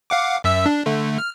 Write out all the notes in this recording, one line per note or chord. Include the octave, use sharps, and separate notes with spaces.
F5 F#5 D6
F#2 E5 E6
D4
D3 A3
F6